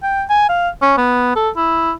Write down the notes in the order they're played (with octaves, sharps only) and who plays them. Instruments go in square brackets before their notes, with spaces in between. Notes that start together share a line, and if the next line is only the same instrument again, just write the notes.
[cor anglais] G5
G#5
F5
C#4
B3
A4
E4